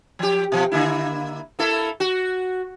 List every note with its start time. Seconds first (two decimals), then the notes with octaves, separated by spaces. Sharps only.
0.19 F3 G4
0.52 B2 F3
0.72 D3 A#3 E4
1.59 A#3 E4 A4
2.00 F#4